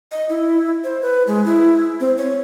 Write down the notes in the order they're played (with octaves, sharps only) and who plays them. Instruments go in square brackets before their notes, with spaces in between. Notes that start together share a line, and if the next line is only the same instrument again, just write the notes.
[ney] D#5
E4
C5
B4
G#3
E4
C4
C#5